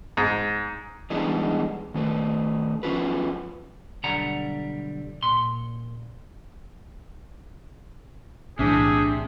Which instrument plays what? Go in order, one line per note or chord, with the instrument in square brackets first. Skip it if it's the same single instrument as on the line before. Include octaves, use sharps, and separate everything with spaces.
[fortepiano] G#2
[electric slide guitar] E3 G3 G#3 B3 D4 D#4
D#3 A3 B4
F3 C#4 F4 F#4 B4
[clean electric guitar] B1 D3 G3 F#5 A#5
A#2 C6
[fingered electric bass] B1 A2 E3 [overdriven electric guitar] C3 [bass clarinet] D4 [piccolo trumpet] G#4